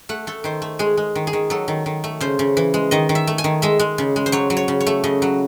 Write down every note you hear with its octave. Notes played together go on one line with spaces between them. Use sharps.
A3 F#5
A3 A4
D#3 C5
A3
G#3 G#4
G#3
D#3
G#4
D#3
F#3 A4
D#3
D#3
A3
C#3 C5
C#3
E3
G#3
D#3 D#5
D#3
E5
A3
G#5
D#3
G#3 E5
G#3
C#3
G#3
C5
F#3 C#5
F#3
C#5
C#3
C#5
A3
C#3 D#5
F#3